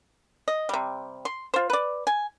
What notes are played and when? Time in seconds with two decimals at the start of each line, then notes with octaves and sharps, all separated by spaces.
0.48 D#5
0.69 C3 G3
1.25 C6
1.54 F4 C5
1.70 B4 D5
2.07 G#5